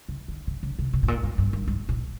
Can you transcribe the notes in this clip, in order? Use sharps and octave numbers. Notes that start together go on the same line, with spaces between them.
C#3
D3
C#3
C#3
C3
C3
A2
A#2
G#2
G2
G2
G#2
A#2